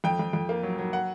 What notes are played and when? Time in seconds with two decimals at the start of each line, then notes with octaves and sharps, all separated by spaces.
0.04 F2 G5
0.19 F2
0.33 F2
0.49 A#3
0.63 F#3
0.79 F#3
0.93 F#5